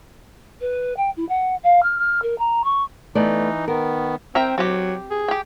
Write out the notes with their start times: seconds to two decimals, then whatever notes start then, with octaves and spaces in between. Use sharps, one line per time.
0.61 B4
0.97 G5
1.17 E4
1.29 F#5
1.64 F5
1.83 F6
1.99 F6
2.23 A#4
2.39 A#5
2.64 C#6
3.15 E3 A3 B3 D#4 D5
3.68 D#3 B3 A#4
4.35 C4 A#4 E5 G5
4.58 F#3 C4 G4
5.11 G#4
5.28 G4 G5